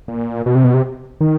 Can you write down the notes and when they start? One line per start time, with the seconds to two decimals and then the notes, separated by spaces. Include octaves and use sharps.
0.08 A#2
0.46 B2
0.55 C3
0.64 B2
0.74 C3
1.21 D#3